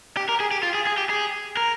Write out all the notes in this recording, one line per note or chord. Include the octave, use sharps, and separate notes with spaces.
G4
A#4
G#4
G4
F4
G#4
G#4
G4
G#4
A#4